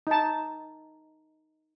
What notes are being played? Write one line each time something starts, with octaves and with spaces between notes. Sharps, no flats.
D#4 A5